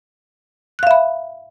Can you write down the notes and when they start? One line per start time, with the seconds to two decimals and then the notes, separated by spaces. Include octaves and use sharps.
0.79 F#6
0.83 F5
0.87 E5
0.91 B5